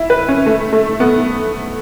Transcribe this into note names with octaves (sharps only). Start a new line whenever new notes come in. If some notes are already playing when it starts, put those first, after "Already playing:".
Already playing: E4
B4
C#4
A3
A3
B3